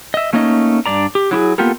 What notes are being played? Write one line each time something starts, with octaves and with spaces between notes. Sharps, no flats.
D#5 E5
A3 A#3 C#4 D#4 C5 D#5
G2 D4 D5 A#5
G4
F#3 E4 G4 G#4
A#3 B3 F4 G4 A4 A#4